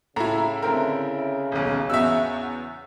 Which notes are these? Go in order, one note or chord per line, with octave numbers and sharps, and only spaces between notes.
A2 C#3 E4 A#5
D3 C4 A#4
D#1 B1
E2 B3 F#4 E5 E6